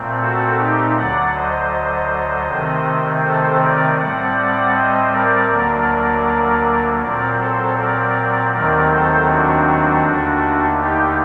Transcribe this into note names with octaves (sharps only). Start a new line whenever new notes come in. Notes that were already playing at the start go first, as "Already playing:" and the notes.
Already playing: A#2 A3 C4
F#4 A4
D#4 G4
D2 D3 F#3 D5 F#5
C5 D#5
C3 D#3 A3 C4
A4 C5
A#4 D5
A2 G3 C4 D5 F#5
D5 F#5
C5 D#5
A#4 D5
D2 D3 F#3 A#3
A#2 F#3 C4 A#4 D5
A4 C5
A#4 D5
D#2 D#3 F#3 A3 C4 A#4 D5
A4 C5
D4 F#4
D#2 D3 A3
D#4 G4